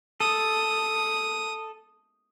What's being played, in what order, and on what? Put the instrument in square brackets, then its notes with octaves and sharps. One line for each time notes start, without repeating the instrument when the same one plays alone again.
[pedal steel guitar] A4 [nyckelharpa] D#6